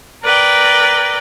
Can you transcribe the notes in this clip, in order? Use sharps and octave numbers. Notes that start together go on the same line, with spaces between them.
A#4 B4 D5 G5